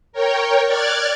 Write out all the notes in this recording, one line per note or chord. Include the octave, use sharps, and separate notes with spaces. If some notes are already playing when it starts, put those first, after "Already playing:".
A#4 C#5 G5
D5 F6 F#6 G#6 A6